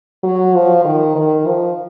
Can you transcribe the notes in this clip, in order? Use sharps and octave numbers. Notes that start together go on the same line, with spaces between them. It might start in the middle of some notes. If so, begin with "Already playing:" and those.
F#3
F3
D#3
D#3
F3